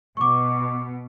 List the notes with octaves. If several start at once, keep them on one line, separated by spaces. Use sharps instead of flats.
B2 C#6 D6